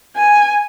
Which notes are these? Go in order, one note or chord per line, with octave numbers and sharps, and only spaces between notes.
G#5